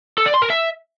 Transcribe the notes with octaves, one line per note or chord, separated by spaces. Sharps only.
A4
D5
C6
A#4
E5